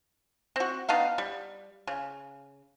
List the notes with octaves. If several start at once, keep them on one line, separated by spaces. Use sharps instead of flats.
C4 F#4
B3 D4 D#4 F5
G3
C#3